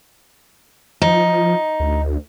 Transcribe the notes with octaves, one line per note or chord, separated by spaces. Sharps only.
F3 D#4
D2